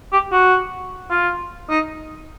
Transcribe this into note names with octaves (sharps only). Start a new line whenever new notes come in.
G4
F#4
F4
D#4